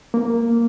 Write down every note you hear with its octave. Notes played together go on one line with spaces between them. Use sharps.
A#3